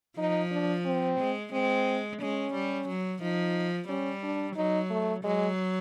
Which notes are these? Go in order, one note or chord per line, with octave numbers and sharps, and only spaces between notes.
F3 D#4
D4
C4
G#3
G#3 C4
G#3 C#4
G3
F#3
F3 D#4
G3 C#4
D4
F#3 D#4
A3
F#3 G#3